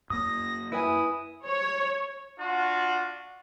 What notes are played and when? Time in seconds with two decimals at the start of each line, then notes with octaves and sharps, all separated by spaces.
0.10 F#2 A#3 D#6 A#6
0.72 E4 B4 E5 G#5 D#6
1.47 C#5
2.40 D4 F4 F#4